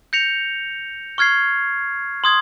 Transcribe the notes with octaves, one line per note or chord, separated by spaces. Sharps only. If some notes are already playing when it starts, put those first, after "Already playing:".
G6 A#6 C#7 F7
C#6 F6 G#6 C7
C6 D#6 G#6